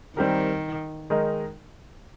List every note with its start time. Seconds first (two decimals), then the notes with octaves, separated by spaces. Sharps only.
0.17 D#3 G3 C4 G4 A#4
1.10 D#3 G#3 D#4 A#4 D#5